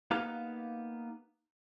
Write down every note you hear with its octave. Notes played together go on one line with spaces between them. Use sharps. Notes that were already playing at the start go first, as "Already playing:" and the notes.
A#3 B3 D#4 G4 B4 F5